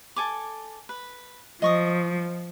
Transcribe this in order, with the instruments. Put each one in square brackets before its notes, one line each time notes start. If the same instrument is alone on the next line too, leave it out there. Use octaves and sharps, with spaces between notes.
[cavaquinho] A4 G#5 D6
B4
[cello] F3 [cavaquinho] D#5 C#6 D#6